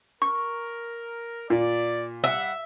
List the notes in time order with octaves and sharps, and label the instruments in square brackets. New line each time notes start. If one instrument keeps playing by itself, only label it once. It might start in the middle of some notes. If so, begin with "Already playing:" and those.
[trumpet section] A#4 [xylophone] C#6
[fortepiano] A#2 [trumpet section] D5
[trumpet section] G3 F#5 [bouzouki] E5